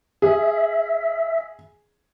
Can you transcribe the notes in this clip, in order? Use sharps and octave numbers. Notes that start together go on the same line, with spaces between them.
G#4 E5